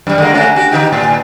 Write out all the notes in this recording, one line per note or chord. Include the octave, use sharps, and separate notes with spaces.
F#2 G3
D3 G#3 A#3
A3 C#4 F#4
F#4 G4
D3 D#4 G4
A2